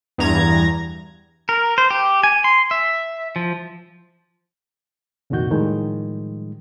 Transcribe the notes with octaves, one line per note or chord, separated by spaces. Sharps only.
E2 G2 A#5 G#6
A#4
C5
G4
G#5
C6
E5
F3
C2 F2 A#2 D#3 F#4 G6
A2 D#3 F3 G3 G#3